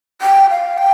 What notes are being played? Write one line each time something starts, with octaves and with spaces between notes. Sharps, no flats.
G5
F5
G5